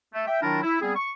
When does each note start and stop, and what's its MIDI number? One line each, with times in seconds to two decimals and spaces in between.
0.14 0.24 57
0.27 0.40 76
0.27 0.40 79
0.42 0.62 51
0.42 0.62 54
0.42 0.62 62
0.42 0.62 64
0.42 0.62 65
0.42 0.62 70
0.63 0.78 64
0.81 0.94 55
0.81 0.94 59
0.81 0.94 60
0.81 0.94 68
0.96 1.11 85